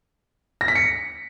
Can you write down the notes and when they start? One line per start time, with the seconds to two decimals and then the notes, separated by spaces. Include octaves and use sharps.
0.61 A#6
0.68 B6
0.75 C#7